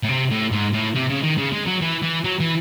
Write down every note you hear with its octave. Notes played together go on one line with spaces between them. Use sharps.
A2
C3
A2
G#2
A2
C3
C#3
D#3
C#3
G#3
F#3
E3
E3
F#3
E3